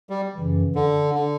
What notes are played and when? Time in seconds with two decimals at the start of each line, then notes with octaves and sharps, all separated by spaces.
0.10 G3
0.36 F#2 C#3 E3
0.75 D3
1.15 D3